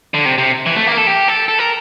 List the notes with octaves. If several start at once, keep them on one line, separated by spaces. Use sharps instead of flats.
D3
C3
C3
E3
A3
A#3
A#4
A4
G4
A4
A4
A#4